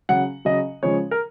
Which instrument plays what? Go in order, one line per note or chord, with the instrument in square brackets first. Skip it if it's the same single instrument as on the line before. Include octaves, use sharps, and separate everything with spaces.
[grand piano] C#3 F#3 F#5
C#3 F#3 D#5
C#3 F3 G#3 C#5
A#4